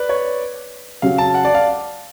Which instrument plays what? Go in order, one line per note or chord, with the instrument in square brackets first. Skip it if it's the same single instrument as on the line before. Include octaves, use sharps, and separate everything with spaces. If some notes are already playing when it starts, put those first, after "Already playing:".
Already playing: [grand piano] B4 D5
C#5
[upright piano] C#3 F#3 C#4 F#4 [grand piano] F5
[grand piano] A5
F#5
D5
F5